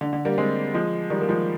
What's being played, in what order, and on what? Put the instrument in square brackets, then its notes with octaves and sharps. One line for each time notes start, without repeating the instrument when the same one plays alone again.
[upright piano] D3
D3
G3 A#3
G#3 C4
F3 G#3
D#3 G3
A#3
F3 G#3